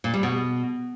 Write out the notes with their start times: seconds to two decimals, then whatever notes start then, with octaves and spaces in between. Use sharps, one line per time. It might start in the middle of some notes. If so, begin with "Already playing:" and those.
0.04 A#2
0.14 G3
0.23 B2